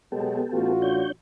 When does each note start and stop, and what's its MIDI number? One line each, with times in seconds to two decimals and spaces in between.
0.12 0.40 47
0.12 0.40 54
0.12 0.40 56
0.12 0.73 59
0.12 0.73 67
0.12 0.73 69
0.52 1.04 33
0.52 1.04 65
0.52 1.04 66
0.82 1.12 62
0.82 1.12 73
0.82 1.12 91